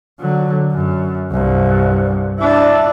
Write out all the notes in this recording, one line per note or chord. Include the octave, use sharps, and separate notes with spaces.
D3 F#3
F#2
C2 G2
D4 E4